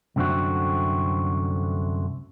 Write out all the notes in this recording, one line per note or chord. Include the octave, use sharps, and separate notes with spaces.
C2 F#2 D3 A3 C4 F#4